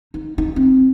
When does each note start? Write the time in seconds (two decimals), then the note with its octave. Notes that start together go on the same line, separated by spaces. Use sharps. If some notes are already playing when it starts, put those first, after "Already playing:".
0.14 D#4
0.38 D#4
0.56 C4